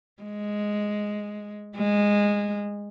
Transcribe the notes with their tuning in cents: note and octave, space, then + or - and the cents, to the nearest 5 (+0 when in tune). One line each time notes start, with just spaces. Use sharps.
G#3 +0
G#3 -15